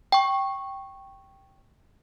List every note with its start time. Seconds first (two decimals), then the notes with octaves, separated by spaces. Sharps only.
0.12 G5 C#6